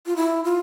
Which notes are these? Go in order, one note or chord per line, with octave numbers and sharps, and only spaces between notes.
F4
E4
F4